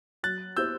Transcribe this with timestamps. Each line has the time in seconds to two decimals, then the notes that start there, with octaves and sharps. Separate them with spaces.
0.23 F#3 F#6 A6
0.57 B3 E4 G4 C5 E6 G6